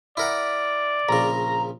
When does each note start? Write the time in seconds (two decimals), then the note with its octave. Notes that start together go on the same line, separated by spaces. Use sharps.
0.17 E4 A#4 D5 F#5
1.09 A#1 C#3 A#5